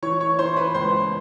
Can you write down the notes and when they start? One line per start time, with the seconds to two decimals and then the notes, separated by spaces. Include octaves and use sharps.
0.02 E3 C#5 C#6
0.20 C#5 C#6
0.39 E3 C5 C6
0.56 B4 B5
0.74 C#2 C5 C6